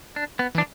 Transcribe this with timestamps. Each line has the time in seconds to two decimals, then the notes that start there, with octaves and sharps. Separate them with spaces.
0.16 D4
0.39 B3
0.55 E3
0.58 D4